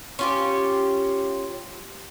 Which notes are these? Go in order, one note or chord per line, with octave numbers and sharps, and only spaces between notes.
C#4 F4 G4